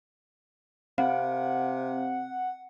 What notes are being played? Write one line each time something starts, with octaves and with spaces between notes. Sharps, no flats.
C3 C4 F5 F#5